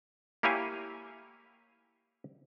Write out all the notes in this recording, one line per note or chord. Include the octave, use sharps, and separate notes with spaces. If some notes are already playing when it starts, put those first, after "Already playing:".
A#3 E4 G4 C#5 F5 G#5